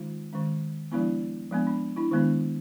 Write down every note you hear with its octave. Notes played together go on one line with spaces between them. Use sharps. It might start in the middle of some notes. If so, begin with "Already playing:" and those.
Already playing: D#3 G#3 C#4 D#4 F4
D#3 G#3 C#4
F3 G#3 B3 D4 E4
F3 G#3 B3 D4
D4
D4 E4
D#3 G#3 B3 D4